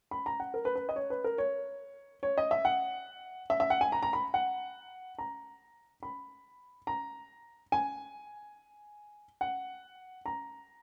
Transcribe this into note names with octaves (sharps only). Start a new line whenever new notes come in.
B5
A#5
F#5
A#4
B4
B4
D#5
C#5
B4
A#4
C#5
C#5
D#5
E5
F#5
E5
E5
F#5
G#5
A#5
A#5
B5
F#5
A#5
B5
A#5
G#5
F#5
A#5